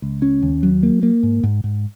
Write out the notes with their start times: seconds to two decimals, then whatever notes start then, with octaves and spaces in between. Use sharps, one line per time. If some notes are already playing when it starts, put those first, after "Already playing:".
0.02 C#2
0.22 C#4
0.42 D#2
0.63 F#3
0.83 A#3
1.03 A#3
1.23 G#2
1.43 G#2
1.64 G#2